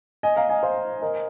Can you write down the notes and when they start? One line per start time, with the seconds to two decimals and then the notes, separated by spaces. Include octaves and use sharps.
0.23 D#5 G#5
0.36 F5 A#5
0.49 D#5 G#5
0.63 C5 F5
1.01 A#4 D#5